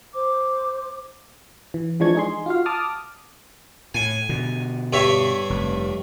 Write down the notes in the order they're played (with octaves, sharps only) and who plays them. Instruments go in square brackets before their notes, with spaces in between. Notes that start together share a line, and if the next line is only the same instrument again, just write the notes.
[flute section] C5 D6
[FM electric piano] E3
E3 F3 G#3 D4 C#6 G#6
D#4 G#4 C6
F4 F#4 F5
A5 D6 D#6 F6
[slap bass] A2 [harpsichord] G#5
[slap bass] B2 D3
[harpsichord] G2 C#5 E5
[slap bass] F1